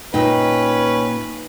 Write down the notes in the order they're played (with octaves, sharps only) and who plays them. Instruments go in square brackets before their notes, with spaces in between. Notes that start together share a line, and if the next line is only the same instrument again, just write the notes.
[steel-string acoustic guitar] A#2 G5 [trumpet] C#4 [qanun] D#4 [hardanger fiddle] B4